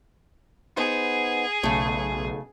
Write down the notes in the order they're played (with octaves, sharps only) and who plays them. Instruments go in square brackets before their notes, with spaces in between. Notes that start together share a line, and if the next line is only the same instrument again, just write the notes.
[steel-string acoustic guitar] B3 D#4 C5 [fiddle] G#4
[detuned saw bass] B1 [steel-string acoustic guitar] C#3 A3